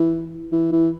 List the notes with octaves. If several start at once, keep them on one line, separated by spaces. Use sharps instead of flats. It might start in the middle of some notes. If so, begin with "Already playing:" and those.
Already playing: E3
E3
E3